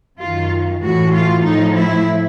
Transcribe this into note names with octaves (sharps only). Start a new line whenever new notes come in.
F#2 D#3 F4
A2 E3 F#4
F4
A2 F3 D#4
E4